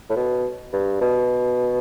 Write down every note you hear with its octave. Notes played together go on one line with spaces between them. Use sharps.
A2
B2
G2
B2